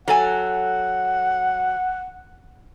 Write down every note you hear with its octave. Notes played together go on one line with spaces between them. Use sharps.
F#3 A4 F#5 G#5